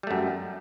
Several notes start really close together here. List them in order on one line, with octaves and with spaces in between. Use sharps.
G3 A3 F#2